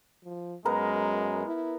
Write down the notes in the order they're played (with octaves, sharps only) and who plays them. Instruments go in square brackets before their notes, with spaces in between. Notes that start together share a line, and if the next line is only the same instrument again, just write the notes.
[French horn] F3
[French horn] F#2 [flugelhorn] G#3 [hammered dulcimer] B3 A#4 A#5
[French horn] E4